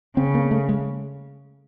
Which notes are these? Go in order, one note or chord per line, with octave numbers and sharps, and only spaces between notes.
C#3 C4
A#3
A3
G#3